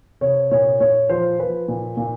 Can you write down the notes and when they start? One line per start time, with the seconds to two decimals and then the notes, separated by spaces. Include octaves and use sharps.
0.21 C3 C#5
0.51 A#2 C#5
0.80 A#2 C#5
1.09 F3 C5
1.39 F3 B4
1.68 A#2
1.97 A#2